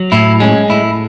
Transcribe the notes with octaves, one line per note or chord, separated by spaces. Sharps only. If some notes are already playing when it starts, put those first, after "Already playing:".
Already playing: F#3
A2 E4
G#3 C#4
A2 E4